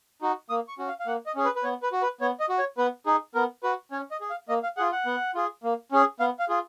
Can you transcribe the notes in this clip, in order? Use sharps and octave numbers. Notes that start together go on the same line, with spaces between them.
D#4 F#4
A#3 D#6
C#6
C#4 F#4
F5
F5
A#3 F#5
D#5
C#4 G#4
B4
B4
B3 C#5
B4
F#4
B4
B3 C#5
D#5
F#4
C#5
B3 B4
D#4 G#4
B3 A#4
F#4 B4
C#4 C#5
D#5
G#4
F5
A#3 D#5
F5
F4 G#4 F#5
F#5
B3
F4 G#4
A#3
C#4 G#4
B3 F5
F5
F4 G#4